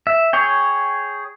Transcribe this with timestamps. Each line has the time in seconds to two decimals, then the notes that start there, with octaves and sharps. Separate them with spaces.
0.07 E5
0.33 G#4 C#5 G5